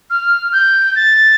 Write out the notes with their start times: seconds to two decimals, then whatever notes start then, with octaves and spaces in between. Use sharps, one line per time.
0.10 F6
0.53 G6
0.96 A6